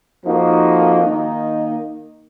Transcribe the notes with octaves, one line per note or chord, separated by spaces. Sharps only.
F2 F3 A#3 D#4 F#4
D#3 A#3 D#4